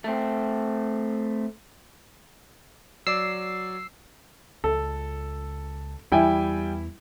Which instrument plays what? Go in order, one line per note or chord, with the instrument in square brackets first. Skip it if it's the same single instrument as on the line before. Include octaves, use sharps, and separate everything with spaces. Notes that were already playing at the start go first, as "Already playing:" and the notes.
[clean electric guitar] A3 C4
[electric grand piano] F#3 D5 D6 [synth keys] E6 C7
[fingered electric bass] C#2 [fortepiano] A4
[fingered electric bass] E2 E3 [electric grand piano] G3 G5 G#5 [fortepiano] E4 E5